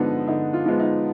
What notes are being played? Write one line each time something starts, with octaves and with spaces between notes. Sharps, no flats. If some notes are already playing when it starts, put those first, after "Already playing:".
Already playing: D3 F3 G#3 B3 D4 D#4
D3 D#4
F4
F3 G#3 B3
D#4